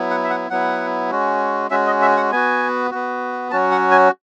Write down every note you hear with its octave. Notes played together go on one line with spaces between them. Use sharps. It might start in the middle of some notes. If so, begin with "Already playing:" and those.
Already playing: F#3 B3 E4
F#5
E5
F#5
F#3 B3 E4 F#5
G#3 C#4 F#4
G#3 C#4 F#4 E5
D#5
E5
F#5
B3 F#4 G#5
B3 F#4
F#3 C#4 F#4 A5
F#5
G#5